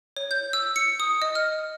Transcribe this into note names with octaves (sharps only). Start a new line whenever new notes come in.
C#5
G6
E6
C#7
D#6
D#5
F6